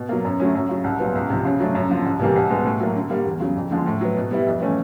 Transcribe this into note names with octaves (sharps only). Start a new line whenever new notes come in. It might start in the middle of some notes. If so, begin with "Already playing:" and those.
Already playing: B2
F#3 A#3
F#2
D3 F#3 A3 C#4
F#2
C#3 F#3
C2
A#2 F#3 B3
C#2
C3 F3
C#3
F#3 A3 D4
F#2
D3 F3
C2
C3 E3 G3 A#3
C2
B2 G#3 B3
A2
F#3 A#3
D3
G3 A#3
E2
C#3 F#3
F2
D3 F3 G#3
A2
F#3 B3
B2
G3 B3 E4
F2
C#3 E3 A3 C#4